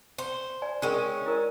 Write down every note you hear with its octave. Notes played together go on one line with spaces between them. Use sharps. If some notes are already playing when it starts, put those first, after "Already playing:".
C5
D5 G#5
G#3 C#4 D4 A#4 G5
E4 A#4 D5